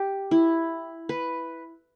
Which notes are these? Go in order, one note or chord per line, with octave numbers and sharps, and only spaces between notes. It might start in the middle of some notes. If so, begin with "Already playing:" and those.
Already playing: G4
E4
B4